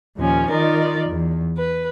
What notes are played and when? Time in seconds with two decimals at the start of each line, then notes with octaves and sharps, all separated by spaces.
0.17 D#2 A#2 F3 C#4
0.50 D#3 D#4 F4 A#4 D5
1.09 E2
1.57 B4